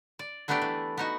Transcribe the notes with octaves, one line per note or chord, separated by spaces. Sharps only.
D5
F#3 A3 B3 D4 G4 D5
E3
B3 D#4 F#4